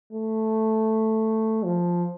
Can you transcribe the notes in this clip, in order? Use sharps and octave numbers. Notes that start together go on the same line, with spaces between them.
A3
F3